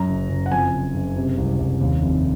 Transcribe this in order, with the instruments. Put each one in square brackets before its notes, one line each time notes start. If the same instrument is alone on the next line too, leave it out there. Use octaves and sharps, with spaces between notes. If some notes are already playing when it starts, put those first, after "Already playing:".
Already playing: [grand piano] F#2 A#5
F#1
F#1
F#5
F2 G#5
F#1
F#1
C3
C2
C2
D#2
F1